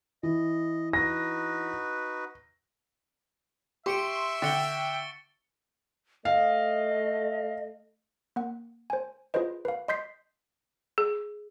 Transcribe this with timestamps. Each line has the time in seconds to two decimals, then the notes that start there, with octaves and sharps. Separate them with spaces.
0.23 E3 D#5
0.93 D#4 F#4 B4 A#6
3.86 G4 E5 C6 C#6 C#7 D7
4.42 D3 G5 A6 C#7 G7
6.25 A3 D#5 F5
8.36 A#3 F#5
8.90 C5 G#5
9.34 F4 G#4 B4 C5 D#5
9.65 B4 F5
9.88 D#5 C6 G6 B6 C7
10.98 G#4